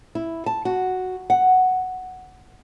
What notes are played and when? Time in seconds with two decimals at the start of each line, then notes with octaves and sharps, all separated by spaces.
0.15 E4
0.46 A5
0.65 F#4
1.30 F#5